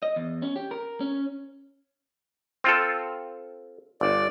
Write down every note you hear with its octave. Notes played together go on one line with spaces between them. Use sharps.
D#5
E2
C#4
G4
A#4
C#4
C4 F4 A4
G1 D5